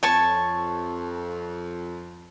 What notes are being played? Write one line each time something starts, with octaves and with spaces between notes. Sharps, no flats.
F2 C#5 A5 C#6